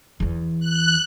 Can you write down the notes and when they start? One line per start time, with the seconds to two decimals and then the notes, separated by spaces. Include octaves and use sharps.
0.20 E2 E3
0.60 F#6